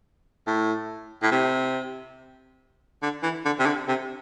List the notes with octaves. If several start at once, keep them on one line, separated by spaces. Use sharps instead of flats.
A2
A2
C3
D3
E3
D3
C3
D3
C3